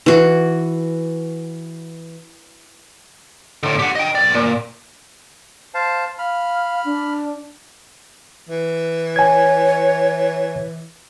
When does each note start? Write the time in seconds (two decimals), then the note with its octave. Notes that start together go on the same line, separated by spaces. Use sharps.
0.06 E3 F#4
3.63 A2 D3
3.79 G4 F#5
3.95 D#5 G5
4.15 B1 D5
4.35 A#2
5.74 C5 F5 A5
6.19 F5 B5 F6
6.85 D4
8.49 E3
9.16 C#5 G#5 G#6